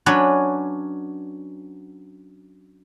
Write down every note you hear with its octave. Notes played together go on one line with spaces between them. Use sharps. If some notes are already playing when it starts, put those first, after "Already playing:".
F#3 C#4 D4 B4 C#5